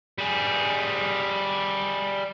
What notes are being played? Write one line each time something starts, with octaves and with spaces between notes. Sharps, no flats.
G3 G#4